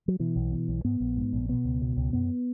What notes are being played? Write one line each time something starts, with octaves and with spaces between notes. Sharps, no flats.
F#3
B2 E3
B1
B2
B1
G#2 B3
A#1
G#2
A#1
B2 B3
C#2
B2
C#2
F#2 B3